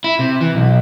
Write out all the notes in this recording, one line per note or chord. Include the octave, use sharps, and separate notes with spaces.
E4
C3
E3
B1